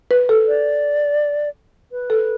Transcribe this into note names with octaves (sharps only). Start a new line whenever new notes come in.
B4
A4
D5
B4
A4